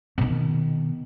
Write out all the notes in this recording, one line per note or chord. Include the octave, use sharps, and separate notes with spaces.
B2 D#3